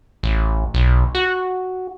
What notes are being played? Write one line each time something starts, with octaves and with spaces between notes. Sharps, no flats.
A1
B1
F#4